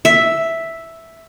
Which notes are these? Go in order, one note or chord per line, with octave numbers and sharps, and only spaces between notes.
E5